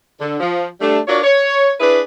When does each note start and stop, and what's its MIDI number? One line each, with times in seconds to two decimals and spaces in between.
0.21 0.38 50
0.40 0.67 53
0.80 0.99 55
0.80 0.99 57
0.80 0.99 62
1.08 1.23 62
1.08 1.23 65
1.08 1.23 66
1.08 1.23 70
1.08 1.23 73
1.08 1.23 74
1.23 1.73 73
1.80 2.01 62
1.80 2.01 64
1.80 2.01 68
1.80 2.01 71